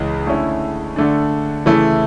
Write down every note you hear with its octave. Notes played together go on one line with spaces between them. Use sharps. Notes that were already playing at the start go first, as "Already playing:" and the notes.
Already playing: C#2 C#3 E3
D3 A3 C#4 E4
D3 A3 D4
C#3 E3 A3 E4